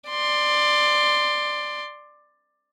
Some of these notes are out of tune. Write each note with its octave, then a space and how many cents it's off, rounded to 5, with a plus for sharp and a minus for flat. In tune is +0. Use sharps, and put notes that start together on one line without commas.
D5 +15 C6 +0